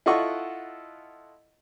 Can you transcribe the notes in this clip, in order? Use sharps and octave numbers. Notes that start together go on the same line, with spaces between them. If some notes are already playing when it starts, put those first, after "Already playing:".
E4 F4 A4 D#5 F#5 C#6